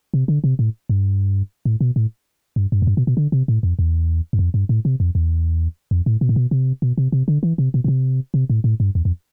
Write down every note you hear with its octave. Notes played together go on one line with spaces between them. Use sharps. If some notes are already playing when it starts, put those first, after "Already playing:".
C3
D3
C3
A2
G2
A2
B2
A2
G2
G2
F2
G2
B2
B2
D3
C3
A2
F2
E2
G2
F2
G2
A2
C3
F2
E2
F2
A2
B2
A2
B2
C3
B2
C3
C3
D3
E3
C3
B2
B2
C3
C3
A2
A2
G2
E2
F2